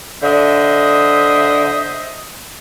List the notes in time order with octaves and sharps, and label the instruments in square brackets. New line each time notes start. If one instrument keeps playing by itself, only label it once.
[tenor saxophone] D3 [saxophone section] C5 D#5 E5